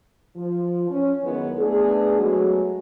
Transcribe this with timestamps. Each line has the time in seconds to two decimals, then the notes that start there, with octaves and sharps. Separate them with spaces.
0.36 F3
0.90 C#4
1.24 F#2 D#3 G#3 B3 E4 C#5
1.59 A3 B3 D4 G#4
2.19 F#3 G#3 A3 B3 F#4